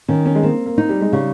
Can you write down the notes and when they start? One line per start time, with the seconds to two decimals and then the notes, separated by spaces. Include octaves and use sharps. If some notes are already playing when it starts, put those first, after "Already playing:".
0.08 D#3 C#4
0.26 C#4
0.35 G#3
0.43 A#3 C4
0.66 A#3
0.78 D#4
0.89 G3
1.01 G#3
1.12 C#3 G3